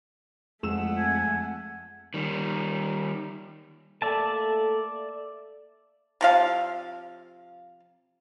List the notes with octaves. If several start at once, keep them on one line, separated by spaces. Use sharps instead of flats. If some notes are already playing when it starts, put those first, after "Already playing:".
F2 G#3 A3 F#5 E6 E7
G#5
D#3 G3
A3 A#3 A4 D5 E5 A5
C3 F3 F5